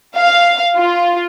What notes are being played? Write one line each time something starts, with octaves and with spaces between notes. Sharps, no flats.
F5
F4